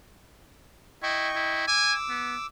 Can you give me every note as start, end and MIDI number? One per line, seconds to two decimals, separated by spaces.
1.03 1.29 64
1.03 1.65 75
1.03 1.65 79
1.03 1.65 85
1.36 1.66 64
1.68 1.94 80
1.68 2.46 86
1.68 2.46 88
2.10 2.36 59